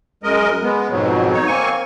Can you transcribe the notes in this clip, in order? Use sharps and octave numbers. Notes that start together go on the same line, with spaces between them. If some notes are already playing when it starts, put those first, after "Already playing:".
F#2 G#3 A#4 D#5
G#3 B3
F2 G#2 B2 F#3
D#4 C#5
A#3 C4 G#5 C#6